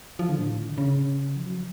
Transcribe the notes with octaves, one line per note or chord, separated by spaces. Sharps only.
F3
D3
A2
D3
C#3
F3
F#3
F3